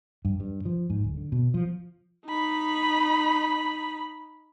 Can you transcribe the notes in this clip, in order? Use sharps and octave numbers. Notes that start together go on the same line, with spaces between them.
G2
G2
F3
G#2
D1
D3
B2
F3
D#4 B5